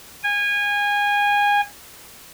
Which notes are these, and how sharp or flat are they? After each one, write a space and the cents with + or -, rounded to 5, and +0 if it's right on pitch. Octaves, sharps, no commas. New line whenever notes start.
G#5 -25